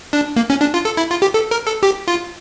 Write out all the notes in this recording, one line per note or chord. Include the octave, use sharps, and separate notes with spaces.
D4
A#3
C#4
D4
F4
A4
E4
F4
G4
A4
A#4
A4
G4
F4